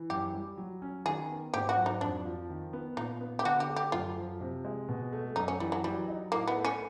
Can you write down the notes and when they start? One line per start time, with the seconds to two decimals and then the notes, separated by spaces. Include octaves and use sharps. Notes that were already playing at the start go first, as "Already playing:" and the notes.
Already playing: E3
0.10 F#2 G4
0.34 G3
0.57 F#3
0.82 C#4
1.05 D#3 G#4
1.30 B3
1.54 G#2 G4
1.69 F#4
1.77 F#3
1.86 D#4
2.01 F2 D4
2.25 F3
2.49 D#3
2.73 B3
2.97 A#2 D#4
3.21 B3
3.39 G4
3.45 D3 F#4
3.60 G4
3.69 A3
3.76 G4
3.92 F#2 F4
4.16 F3
4.41 C3
4.65 G#3
4.89 B2
5.13 A3
5.36 F#2 D#4
5.48 C#4
5.60 E3 G3
5.72 F#3
5.84 F#3 G3
6.08 D#4
6.32 A2 A#3
6.48 B3
6.56 A3
6.65 C#4